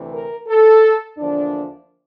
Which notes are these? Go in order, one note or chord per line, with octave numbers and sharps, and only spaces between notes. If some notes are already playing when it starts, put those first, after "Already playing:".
Already playing: D2 C3 E3 A3
A#4
A4
E2 D3 F3 A#3 D4